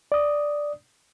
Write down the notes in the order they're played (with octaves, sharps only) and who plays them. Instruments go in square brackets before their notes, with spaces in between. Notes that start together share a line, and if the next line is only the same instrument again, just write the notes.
[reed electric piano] D5 D#6